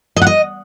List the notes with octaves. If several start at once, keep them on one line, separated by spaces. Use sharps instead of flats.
D#5
F#5
D#5